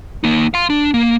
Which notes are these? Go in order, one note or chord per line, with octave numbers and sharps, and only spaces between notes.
A#3 D#4
F5 C6
D4
A#3